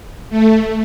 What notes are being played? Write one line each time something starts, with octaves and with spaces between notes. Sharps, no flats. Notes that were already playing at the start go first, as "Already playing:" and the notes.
A3